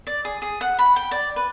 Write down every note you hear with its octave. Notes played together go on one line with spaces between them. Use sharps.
D5
G#4
G#4
F#5
B5
G5
D5
B4